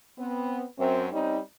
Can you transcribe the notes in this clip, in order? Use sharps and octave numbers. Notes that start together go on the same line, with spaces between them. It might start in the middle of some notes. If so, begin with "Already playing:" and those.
B3 C4
F#2 C4
G3 C4 C#4 D#4